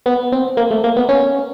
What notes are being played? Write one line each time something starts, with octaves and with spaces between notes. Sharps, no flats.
B3
C4
A#3
A3
A#3
B3
C#4